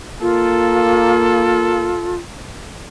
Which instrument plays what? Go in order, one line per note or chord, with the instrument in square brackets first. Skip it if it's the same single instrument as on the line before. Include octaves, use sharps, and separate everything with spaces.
[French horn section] A#3 [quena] F4 [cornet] A4